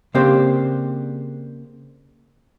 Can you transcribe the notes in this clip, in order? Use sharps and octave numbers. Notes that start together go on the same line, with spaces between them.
C#3 A#3 C4 D4 G4 C5